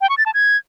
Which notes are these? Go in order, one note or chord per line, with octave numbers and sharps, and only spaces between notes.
G5
C#6
A6
A5
G#6